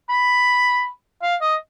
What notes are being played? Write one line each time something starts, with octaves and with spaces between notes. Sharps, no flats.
B5
F5
D#5